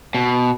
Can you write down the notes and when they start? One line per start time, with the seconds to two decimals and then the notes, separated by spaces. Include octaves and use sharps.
0.15 B2